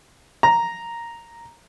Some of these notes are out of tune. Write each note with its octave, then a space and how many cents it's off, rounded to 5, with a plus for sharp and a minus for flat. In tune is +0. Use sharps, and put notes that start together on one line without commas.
A#5 +0